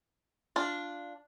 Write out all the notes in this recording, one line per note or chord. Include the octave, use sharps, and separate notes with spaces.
D4 F4